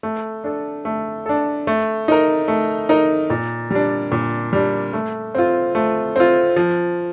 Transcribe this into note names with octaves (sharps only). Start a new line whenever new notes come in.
A3
D4 A4
A3
D4 A4
A3
D#4 A#4
A3
D#4 A#4
A#2
G3 D4
A#2
G3 D4
A3
C4 F4
A3
C4 F4
F3